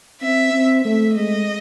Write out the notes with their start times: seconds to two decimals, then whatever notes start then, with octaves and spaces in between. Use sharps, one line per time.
0.22 C4 E5
0.53 C4
0.85 A3 E5
1.16 G#3 D#5